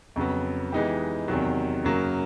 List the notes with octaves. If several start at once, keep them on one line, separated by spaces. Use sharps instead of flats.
F2 C#3 F#3 B3
E3 G#3 B3 D#4 G4
E2 C3 D#3 F#3
F#2 C#3 F#3 A#3